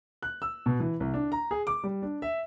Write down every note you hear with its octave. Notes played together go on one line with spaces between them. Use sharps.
F#6
E6
B2
E3
C2
D4
A#5
G#4
D6
G3
D4
E5